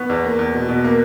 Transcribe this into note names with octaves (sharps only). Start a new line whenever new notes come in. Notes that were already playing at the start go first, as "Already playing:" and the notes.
Already playing: B3 C#6
E2
A#3
E2
B2
B2
A#3